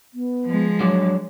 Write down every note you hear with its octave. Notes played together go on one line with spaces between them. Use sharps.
B3
F3 G#3
F#3 D4 C#5 D5